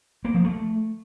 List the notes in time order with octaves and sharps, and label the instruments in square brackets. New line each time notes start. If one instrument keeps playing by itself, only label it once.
[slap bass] A#3
F3
A3